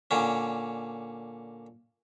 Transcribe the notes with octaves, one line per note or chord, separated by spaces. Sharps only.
A#2 D3 C#4